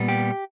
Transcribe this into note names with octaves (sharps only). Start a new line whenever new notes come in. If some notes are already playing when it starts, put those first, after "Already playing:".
Already playing: A#2 G3 B3
G4